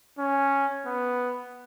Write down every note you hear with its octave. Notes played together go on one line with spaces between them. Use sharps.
C#4
B3